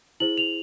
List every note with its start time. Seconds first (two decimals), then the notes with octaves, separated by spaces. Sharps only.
0.20 E4 G#4 C5 F#7
0.37 F7